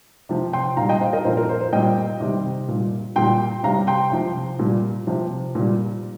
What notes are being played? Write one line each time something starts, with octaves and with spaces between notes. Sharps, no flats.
C3 F3
G5 C6
A#2 G3 F5 A#5
D#5 G5
C5 F5
A#4 D#5
A#2 F3 C5
A#4
C5
C5
A#2 G3 D#5 G5
C3 D#3 G3
A#2 G3
A#2 G3 G5 C6
C3 G3 F5 A#5
G5 C6
C3 F3
A#2 G3
C3 F3
A#2 G3